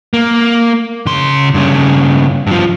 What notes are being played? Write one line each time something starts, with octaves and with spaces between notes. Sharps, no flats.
A#3
C#3 C6
G2 C#3
G2 F3